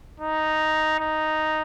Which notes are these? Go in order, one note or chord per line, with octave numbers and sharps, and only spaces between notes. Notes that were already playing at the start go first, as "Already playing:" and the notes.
D#4
D#4